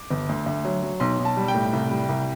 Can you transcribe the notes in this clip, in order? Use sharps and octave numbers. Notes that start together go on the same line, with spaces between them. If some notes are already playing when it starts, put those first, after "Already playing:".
Already playing: D6
G1
D2
D2
F#3
F#3
B1 C6
B1
A5
G3
G5
A2
C2
G3
C2